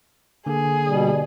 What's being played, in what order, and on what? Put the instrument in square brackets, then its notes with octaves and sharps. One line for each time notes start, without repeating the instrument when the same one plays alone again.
[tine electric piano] D3 A#3 [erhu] G#4
[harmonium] B2 G3